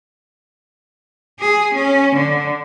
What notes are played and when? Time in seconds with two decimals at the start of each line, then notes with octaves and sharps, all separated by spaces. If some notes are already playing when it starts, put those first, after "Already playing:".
1.40 G#4
1.75 C#4
2.16 D3